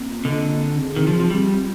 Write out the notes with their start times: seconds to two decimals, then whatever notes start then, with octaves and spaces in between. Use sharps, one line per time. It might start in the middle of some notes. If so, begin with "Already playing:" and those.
Already playing: A#3 C4
0.08 F4
0.25 D3 D#5
0.42 A#3
0.61 C4
0.79 G#4
0.96 D#3 G#4
1.07 F3
1.13 C4
1.20 F3
1.30 G3 C4
1.48 F4